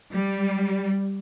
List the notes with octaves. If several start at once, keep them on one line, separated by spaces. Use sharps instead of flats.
G3